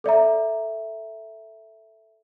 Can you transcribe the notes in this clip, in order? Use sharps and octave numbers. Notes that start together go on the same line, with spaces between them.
A4 D5 E5 A#5